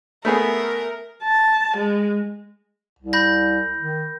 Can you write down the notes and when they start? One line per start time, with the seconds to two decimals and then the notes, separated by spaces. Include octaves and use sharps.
0.25 A3 B3 G#4 A#4
1.23 A5
1.77 G#3
2.99 C2
3.13 B5 G6 A#6
3.79 D#3